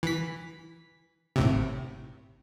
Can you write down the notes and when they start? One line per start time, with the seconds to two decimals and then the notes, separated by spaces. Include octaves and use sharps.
0.03 E3 B6
1.36 G#1 A2 C3